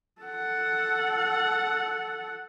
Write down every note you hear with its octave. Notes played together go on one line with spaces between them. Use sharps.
A4 F#5